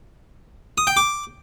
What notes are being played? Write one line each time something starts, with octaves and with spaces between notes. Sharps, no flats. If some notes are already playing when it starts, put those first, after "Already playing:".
D#6
G5
D6